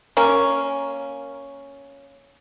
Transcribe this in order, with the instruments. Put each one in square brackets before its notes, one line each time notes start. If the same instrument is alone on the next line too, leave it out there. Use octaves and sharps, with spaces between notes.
[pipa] A#3 C#4